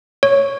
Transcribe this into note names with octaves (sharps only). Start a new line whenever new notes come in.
C#5